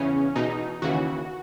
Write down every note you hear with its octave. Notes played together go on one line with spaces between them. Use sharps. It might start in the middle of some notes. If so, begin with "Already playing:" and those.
Already playing: E2 C#3 E3 C#4
E2 B2 D#4
D#2 C#3 E3 F#4